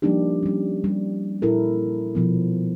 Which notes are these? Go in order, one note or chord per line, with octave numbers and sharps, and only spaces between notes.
F3 G3 A#3 D4 D#4 G4
G3 C#4
G3
A#2 E4 A4 A#4
B2 F3 B3